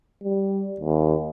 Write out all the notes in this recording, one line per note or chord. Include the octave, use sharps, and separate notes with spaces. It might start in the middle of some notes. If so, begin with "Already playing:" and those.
G3
D#2